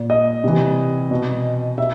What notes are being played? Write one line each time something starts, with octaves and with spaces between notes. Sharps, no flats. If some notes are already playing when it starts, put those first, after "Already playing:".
Already playing: A#2
D#5
C3 E3
B2
B2 E5